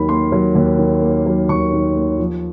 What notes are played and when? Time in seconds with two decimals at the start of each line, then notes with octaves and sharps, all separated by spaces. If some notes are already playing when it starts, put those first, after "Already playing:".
Already playing: D#2 D#3 F#3 B5
0.09 A#3 C6
0.32 F#3
0.55 D#2
0.79 D#3
1.02 A#3
1.26 F#3
1.49 D#2 C#6
1.73 D#3
1.96 A#3
2.18 F3